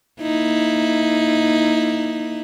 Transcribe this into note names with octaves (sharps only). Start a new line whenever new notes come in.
A#3 D#4 E4